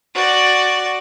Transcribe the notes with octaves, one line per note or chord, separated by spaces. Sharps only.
F#4 D5